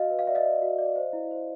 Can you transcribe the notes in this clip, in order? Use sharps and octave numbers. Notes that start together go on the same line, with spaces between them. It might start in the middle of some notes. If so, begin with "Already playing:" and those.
Already playing: F#4 D#5 F5
B4
F5
D5 E5
D#5 F5
D5
F#4
D5
C5
E4
C5